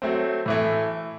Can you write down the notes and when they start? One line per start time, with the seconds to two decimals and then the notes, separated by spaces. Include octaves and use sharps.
0.02 F#3 A3 C4
0.46 A2 E3 A3